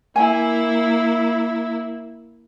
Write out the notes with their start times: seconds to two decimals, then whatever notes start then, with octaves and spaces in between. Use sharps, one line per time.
0.16 A#3 E4 G#5